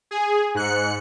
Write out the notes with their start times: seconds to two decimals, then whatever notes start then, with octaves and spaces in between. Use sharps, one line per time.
0.11 G#4
0.55 G#2 F#6 C#7